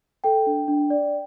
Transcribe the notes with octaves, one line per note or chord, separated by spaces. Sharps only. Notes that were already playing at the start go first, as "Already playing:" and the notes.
A4 G5
D4
D4
D5